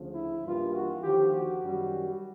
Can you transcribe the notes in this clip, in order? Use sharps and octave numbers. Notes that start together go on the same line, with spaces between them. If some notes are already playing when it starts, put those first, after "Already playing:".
Already playing: D2 C#3 F3
E4
G2 E3 G3 A#3 F4
F#4
D#2 D3 F3 G4
F#4
F#2 D#3 G3